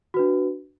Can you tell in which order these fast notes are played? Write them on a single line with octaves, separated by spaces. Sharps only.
F#4 B4 D4